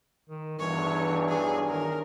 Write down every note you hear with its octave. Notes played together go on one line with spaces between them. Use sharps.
D#3
B1 E2 G2 E3 C#5
G#4
D#3 A#4